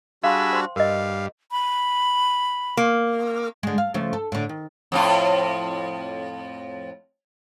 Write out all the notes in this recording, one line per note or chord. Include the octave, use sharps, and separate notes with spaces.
G3 D4 F#4 G#4 F5 B5 C6 E6
C5 G5 C6
G2 A#4 D#5 F5
B5
A#3
D3 G#3
F5
C#3 F3 A3
A4
A2 D3
D#3
F2 A2 F4